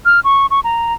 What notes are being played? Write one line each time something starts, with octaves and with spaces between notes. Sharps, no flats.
F6
C#6
C#6
A#5